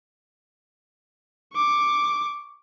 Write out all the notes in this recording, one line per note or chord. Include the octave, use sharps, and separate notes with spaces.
C#6 D6